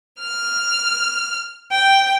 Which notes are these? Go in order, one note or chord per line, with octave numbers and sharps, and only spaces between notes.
F6
G5